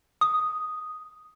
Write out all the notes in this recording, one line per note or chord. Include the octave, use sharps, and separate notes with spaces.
D#6